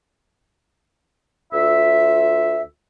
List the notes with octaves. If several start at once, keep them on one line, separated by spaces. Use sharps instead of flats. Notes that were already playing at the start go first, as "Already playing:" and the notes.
D2 F4 E5